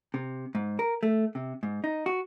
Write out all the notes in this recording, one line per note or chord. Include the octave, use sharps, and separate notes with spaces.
C3
G#2
A#4
A3
C3
G#2
D#4
F#4